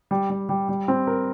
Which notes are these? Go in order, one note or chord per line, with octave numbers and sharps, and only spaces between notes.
G3
G3
G3
G3
C4
A#4